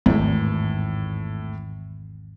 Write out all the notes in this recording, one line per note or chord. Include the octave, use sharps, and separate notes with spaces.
G#1 E2 A2